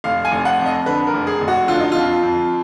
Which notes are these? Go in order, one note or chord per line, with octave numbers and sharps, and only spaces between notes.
F1 F5
G#5
F1
F#5
F2
D#5
D3 B4
A#4
F1
G#4
F1
F#4
D3 F4
D#4
F2 F4
F2